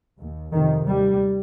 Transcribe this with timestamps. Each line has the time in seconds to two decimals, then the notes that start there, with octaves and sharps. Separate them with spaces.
0.19 D#2
0.52 F2 C3 D#3
0.85 D#2 G3